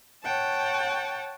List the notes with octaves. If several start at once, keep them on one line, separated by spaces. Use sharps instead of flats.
C#5 F#5 G5 A5